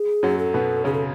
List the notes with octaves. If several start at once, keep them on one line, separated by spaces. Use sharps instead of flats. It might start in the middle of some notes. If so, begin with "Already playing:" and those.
Already playing: G#4
F#2 F#3
A4
B2 B3
C#3 C#4 G#4
A4